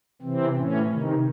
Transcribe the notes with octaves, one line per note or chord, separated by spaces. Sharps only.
C3 E3 C4
A2 E3 C#4
C3 D#3